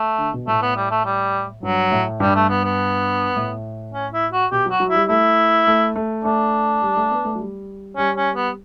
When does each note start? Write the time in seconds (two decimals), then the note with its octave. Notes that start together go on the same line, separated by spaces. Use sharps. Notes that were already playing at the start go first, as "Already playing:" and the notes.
Already playing: A3
0.18 D3
0.33 B2
0.47 A2 A3
0.62 B3
0.76 G3
0.91 A3
1.05 G3
1.63 G2 F#3
1.92 A2
2.20 G2 G3
2.35 A3
2.49 B3
2.64 B3
3.36 A2
3.93 C#4
4.13 E4
4.33 F#4
4.52 B2 G4
4.66 F#3 F#4
4.80 F#3
4.89 E4
4.95 G3
5.09 A3 E4
5.67 A3
5.96 A3
6.24 A3 D4
6.82 G3
6.97 A3
7.11 B3
7.25 A3
7.35 F#3
7.40 G3
7.97 G3 C#4
8.17 C#4
8.36 B3